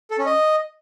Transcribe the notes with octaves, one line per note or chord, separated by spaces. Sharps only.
A4
C#4
D#5